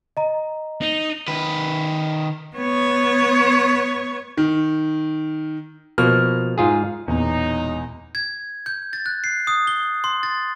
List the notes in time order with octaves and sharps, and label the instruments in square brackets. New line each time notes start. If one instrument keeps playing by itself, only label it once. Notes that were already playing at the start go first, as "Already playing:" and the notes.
[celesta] D#5 A#5
[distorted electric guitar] D#4
[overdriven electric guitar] D#3 B4
[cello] B3 C#5
[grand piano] D#3
[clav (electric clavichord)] B2 F3 A#3 [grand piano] F6
[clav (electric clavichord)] G#2 F4 G#4
[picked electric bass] E1 A#2 [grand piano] E2 [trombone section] F#3 G#3 D#4
[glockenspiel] G#6
G6
A6
F#6
C7
D#6
G7
C6
A6